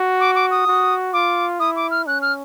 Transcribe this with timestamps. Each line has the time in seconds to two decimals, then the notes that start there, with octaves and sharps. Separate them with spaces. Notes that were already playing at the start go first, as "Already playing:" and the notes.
Already playing: F#4
0.20 D6
0.35 D6
0.51 D#6
0.67 F#4
1.13 F4 D6
1.60 E4 D#6
1.76 D6
1.91 F6
2.07 C#4 F#6
2.22 F6